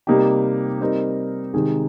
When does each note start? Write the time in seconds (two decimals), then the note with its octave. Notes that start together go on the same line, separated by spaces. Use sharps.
0.07 C3 G3 A#3 D#4 G4
0.81 G3 C4 D#4 A#4
1.54 C3 D#3 G#3 D#4 G#4